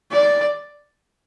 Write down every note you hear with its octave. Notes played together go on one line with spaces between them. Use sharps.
D5